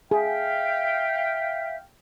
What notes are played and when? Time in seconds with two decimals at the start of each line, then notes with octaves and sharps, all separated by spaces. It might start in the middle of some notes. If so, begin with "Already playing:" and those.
0.11 G#4 E5 F5 G5